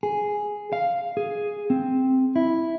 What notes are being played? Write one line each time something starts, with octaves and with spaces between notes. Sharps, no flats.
G#4
F5
G#4
C4
E4